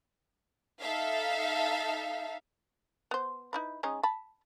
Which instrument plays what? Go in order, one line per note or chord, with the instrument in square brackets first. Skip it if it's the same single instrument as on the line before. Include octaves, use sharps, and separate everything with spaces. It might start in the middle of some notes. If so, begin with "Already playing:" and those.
[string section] D#4 A4 E5 F5
[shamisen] B3 C5
D#4 E4 B4
G#3 C#4 D#4
A5 B5